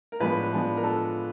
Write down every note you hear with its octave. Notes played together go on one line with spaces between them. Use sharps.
A#4
A2 F3 G#3 B3 D4 B4
A2 F3 G#3 B3 D4
A#4
D4 A4